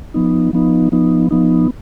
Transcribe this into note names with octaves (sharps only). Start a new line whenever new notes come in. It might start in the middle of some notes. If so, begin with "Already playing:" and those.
F3 B3 D#4
F3 B3 D#4
F3 B3 D#4
F3 B3 D#4